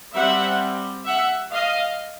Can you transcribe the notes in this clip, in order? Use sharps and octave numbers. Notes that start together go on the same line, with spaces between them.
G3 C4 E5 F#5
E5 F#5
D#5 F5